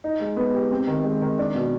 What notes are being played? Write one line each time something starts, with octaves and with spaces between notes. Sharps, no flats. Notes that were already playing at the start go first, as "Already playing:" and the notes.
D#4
G#3
B3
G4
C4
D#3
G#3
D#3
D4
B2